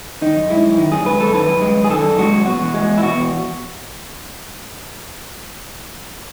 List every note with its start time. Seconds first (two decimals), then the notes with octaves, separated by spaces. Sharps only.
0.21 D#3 D#4
0.36 F#2
0.50 G#3 E4
0.64 F#2
0.77 D#3
0.91 F#2 G#4
1.05 G#3 B4
1.20 F#2 A4
1.34 D#3 B4
1.48 F#2
1.61 G#3
1.76 F#2
1.84 G#4
1.90 D#3 A4
2.04 F#2
2.18 G#3 F#4
2.32 F#2
2.46 B2 F#4
2.60 E2
2.74 G#3
2.88 E2
2.98 E4
3.02 B2 F#4
3.17 E2